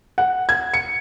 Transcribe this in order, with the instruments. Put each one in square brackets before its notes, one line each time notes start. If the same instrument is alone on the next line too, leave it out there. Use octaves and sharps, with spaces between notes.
[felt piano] F#5
G#6
C#7